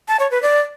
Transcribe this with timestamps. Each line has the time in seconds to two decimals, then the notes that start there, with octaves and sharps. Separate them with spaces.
0.08 A5
0.20 C#5
0.31 B4
0.43 D5